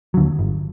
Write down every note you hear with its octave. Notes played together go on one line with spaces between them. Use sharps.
D#2 D3 F#3
G1